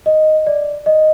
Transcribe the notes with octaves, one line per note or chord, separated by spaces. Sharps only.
D#5
D5
D#5